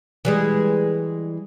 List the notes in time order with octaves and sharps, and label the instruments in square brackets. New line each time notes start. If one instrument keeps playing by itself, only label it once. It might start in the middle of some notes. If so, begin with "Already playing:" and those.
[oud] E3 G3 G#3